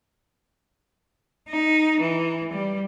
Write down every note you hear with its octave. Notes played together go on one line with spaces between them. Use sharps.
D#4
E3
G3